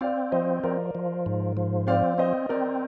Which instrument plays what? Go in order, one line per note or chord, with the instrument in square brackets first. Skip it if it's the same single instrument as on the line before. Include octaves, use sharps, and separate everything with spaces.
[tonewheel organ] C4 [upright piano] D5 F5
[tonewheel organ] F3 [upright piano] C5 D#5
[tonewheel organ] F3 [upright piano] A#4 D5
[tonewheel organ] F3
G#2
F3
[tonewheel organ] C4 [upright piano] D5 F5
[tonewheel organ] C4 [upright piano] C5 D#5
[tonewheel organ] C4 [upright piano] A#4 D5